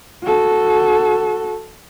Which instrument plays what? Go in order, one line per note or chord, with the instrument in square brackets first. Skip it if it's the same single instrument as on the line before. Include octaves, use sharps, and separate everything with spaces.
[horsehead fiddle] F#4 A4